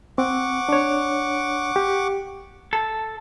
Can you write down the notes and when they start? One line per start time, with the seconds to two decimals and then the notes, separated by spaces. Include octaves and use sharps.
0.18 C4 F#5 C#6 D6
0.69 D4 C#5
1.76 G4
2.73 A4